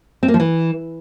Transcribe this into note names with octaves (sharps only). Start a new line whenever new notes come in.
C4
A#3
F3
E3